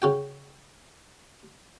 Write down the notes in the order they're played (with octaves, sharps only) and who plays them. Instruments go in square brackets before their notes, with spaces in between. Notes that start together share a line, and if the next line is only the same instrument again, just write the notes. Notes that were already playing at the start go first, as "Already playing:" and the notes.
[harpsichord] C#3 F#4 G5